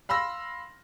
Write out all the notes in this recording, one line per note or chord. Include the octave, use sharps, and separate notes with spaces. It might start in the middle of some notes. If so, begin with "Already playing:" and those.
F5 B5 C6 E6 A#6